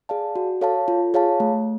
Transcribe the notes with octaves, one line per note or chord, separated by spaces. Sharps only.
G#4 D5 F5 A5
F#4
A4 C#5 F5 A5
F4
G#4 C#5 F5 A5
A3